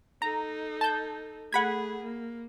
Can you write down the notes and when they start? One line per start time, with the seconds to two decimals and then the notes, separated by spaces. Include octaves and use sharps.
0.22 D#4 A4 A#5
0.81 A5 G6
1.53 A3 G#4 F#5 B5 G#6
2.03 A#3